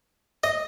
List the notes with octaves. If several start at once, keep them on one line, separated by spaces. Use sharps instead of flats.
D#5